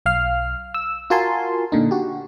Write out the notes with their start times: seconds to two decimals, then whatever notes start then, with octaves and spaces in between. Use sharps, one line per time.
0.06 B1 F5 F6
0.74 E6
1.10 F4 F#4 A#4 G#5 A5 C6
1.72 A#2 D3 D#4
1.91 F#4 G4